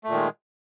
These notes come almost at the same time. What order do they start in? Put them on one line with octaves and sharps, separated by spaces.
A3 A#2 D#3 G#3